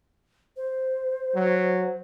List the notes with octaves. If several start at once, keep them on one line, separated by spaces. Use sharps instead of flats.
C5
F#3